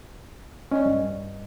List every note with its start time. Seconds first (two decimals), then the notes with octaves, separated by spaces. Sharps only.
0.71 C#4 D5 D#5
0.85 G2